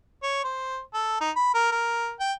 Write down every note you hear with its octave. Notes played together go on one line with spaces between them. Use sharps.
C#5
C5
A4
D#4
B5
A#4
A#4
G5